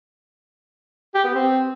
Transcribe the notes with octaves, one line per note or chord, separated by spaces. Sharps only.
G4
B3
C4